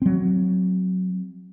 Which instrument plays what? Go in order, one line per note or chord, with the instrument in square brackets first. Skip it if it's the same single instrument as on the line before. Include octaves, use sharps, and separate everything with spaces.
[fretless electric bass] F#3 C4